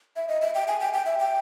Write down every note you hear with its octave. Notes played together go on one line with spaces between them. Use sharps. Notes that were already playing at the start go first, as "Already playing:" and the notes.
E5
D#5
E5
G5
G#5
G5
G5
E5
G5